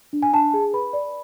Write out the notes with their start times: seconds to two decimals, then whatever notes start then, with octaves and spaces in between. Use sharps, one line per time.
0.13 D4
0.23 G#5
0.33 D4 A5
0.54 G#4
0.73 B4 B5
0.93 D5